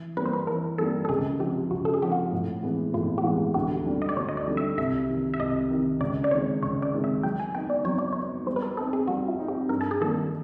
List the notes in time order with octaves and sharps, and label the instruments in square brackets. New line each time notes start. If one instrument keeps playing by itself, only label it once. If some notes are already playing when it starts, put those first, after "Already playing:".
Already playing: [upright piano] E3
[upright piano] G3 A#3 [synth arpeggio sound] B4
[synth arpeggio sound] C5
B4
[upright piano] E3 [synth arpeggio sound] A#4
[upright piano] G3 A#3 [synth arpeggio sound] A4
[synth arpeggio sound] A4
[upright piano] C#2 [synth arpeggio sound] G#4
[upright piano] C3 F3 [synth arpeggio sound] G4
[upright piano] C#2 [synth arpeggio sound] F#4
[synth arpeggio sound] A4
G#4
[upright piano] C3 F3 [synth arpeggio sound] G4
[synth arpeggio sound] F#4
[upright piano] A2
E3 G#3 B3
[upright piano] A2 [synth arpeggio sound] F4
[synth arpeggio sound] G4
[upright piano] E3 G#3 B3 [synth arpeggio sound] F#4
[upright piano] D2 [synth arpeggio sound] G4
[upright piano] D3 G3
[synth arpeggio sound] D#5
D5
[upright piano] D2 [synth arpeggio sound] C#5
[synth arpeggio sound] D#5
D5
[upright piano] D3 G3
[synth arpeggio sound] E5
[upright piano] C2 [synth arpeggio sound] E5
[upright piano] C3 D#3
[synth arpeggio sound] E5
[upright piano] C2 [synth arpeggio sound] D#5
[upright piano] C3 D#3
[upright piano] C#2 [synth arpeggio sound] D5
[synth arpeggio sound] D5
[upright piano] C3 D#3 G#3 [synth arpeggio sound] C#5
[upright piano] C#2 [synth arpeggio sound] C#5
[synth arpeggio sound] D5
[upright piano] C3 D#3 G#3
[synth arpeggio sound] E5
[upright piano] F#3 [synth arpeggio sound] G5
[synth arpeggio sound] G#5
[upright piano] B3 D#4 [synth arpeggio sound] G5
[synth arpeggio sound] D5
[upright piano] F#3 [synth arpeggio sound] C#5
[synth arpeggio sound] D5
[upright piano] B3 D#4 [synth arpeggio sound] C#5
[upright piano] G3 [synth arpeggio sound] C5
[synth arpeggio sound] B4
A#4
[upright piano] C4 D#4 [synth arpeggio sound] A4
[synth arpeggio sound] G#4
[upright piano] G3 [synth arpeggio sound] F#4
[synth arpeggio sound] F4
[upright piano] C4 D#4
[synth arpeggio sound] G4
[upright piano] G2 [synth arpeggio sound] A#4
[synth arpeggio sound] A4
G#4
[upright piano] D#3 G3 A#3 [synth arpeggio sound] A4